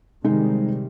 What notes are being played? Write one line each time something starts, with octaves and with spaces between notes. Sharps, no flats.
C3 D#3 G3 G#3 D#4